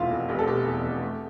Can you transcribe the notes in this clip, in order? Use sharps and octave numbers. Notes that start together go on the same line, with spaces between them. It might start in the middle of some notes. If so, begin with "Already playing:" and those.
Already playing: F1 E2 B2 E4 F4
F1
F1 G4
A4
B2 G4
E2
F1
A3